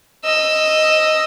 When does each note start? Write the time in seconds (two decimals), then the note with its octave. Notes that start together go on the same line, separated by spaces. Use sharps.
0.25 D#5 E6